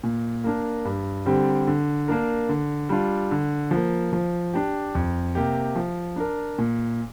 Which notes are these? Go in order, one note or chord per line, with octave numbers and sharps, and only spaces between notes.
A#2
A#3 D4 A#4
G2
D3 G3 C4 G4
D3
A#3 D4 A#4
D3
G3 D4 F4
D3
F3 A#3
F3
D4 G4
F2
C3 A#3 G4
F3
D4 A#4
A#2